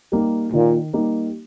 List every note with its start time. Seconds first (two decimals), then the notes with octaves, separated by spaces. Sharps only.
0.12 G3 A#3 D#4 G4
0.53 A#2 D#3
0.93 G3 A#3 D#4 G4